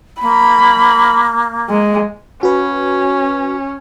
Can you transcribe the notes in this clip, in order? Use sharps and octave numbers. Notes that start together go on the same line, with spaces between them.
A#3 B5
G#3
C#4 F#4 B4